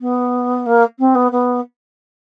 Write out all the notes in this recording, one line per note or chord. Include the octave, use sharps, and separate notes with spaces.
B3
A#3
C4
B3
B3